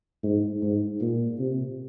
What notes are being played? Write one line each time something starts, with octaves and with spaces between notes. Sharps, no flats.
G#2
G#2
A#2
C3